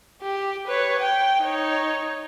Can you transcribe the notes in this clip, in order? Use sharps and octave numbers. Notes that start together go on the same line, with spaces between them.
G4
B4 C#5
G5
D#4 C#5